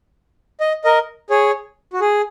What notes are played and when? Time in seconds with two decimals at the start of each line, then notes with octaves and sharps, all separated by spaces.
0.60 D#5
0.84 A#4 D#5
1.30 G#4 C#5
1.93 F#4
2.01 G#4